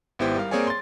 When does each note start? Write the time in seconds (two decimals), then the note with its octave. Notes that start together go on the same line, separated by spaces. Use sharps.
0.19 G#1 B3 E4 G4 C5
0.37 G3 A#4 F5
0.51 A#3 C4 G#4 C#5 D5 G#5
0.67 C6 A6